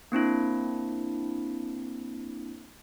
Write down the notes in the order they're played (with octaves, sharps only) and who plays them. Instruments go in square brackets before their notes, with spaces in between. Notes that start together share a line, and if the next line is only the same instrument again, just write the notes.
[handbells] A#3 C4 D4 E4